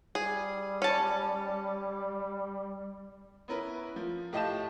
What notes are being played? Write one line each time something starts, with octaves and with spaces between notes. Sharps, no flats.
G3 G#4
C#4 A5
B3 C#4 E4 A#4 B4
F3
A2 G4 D#5 F5 A5 E7